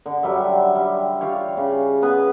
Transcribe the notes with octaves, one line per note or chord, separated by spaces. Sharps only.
D3
F#3 G3 E5
G3
F4 G4 C#5
C#3
B3 B4 G#5